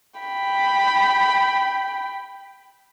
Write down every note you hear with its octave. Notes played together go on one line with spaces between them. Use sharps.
G5 B5